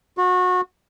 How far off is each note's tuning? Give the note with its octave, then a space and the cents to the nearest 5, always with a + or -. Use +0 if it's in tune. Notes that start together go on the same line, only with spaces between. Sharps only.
F#4 -25